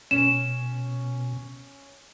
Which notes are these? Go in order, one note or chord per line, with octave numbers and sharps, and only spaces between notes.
B2 C#4 E7